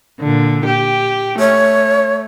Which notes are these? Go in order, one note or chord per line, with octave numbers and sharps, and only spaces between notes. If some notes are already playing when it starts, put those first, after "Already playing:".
A#2 D3
G4
A3 C#5